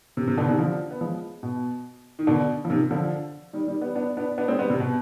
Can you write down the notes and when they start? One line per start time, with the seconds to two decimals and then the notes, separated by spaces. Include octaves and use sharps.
0.17 C3
0.28 C3
0.38 B2 D3
0.48 C3 D#3
0.59 D3 F3
0.91 B3
1.01 F3 G#3
1.43 B2
2.19 D#3
2.27 B2 D3
2.65 F3
2.70 C3 D#3
2.91 D3 F3
3.53 D#3 G3
3.68 D#3 G3
3.81 G3 B3
3.95 B3 D4
4.17 B3 D4
4.38 B3 D4
4.48 G#3 C4
4.59 G3 B3
4.70 C3
4.80 B2